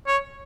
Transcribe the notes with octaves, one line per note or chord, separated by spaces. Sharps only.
C#5